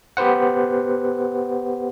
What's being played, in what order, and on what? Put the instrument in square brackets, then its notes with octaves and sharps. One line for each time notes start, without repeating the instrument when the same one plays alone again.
[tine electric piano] B3 G4 B4 C5 F#5